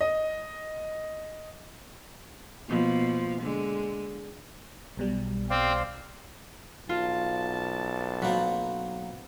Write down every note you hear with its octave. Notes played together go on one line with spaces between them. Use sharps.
D#5
B2 F3 A#3
D3 G#3
B1 B2 G3
C4 C5 D5 F5
B1 F4 A5
F#3 A#3 C4 B4